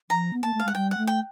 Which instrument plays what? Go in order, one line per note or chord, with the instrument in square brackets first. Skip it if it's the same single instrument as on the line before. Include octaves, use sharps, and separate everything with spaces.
[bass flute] F3 [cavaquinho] A#5
[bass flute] B3
[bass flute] A#3 [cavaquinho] A5
[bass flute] A3
[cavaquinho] F5
[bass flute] G#3 [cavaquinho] F#5
[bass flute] G3 [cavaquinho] G5
[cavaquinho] F#5
[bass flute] A3
[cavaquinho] G5